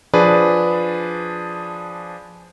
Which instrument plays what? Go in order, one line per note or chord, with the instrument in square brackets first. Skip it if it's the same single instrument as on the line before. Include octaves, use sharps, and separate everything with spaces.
[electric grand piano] F3 D4 G#4 B4 D5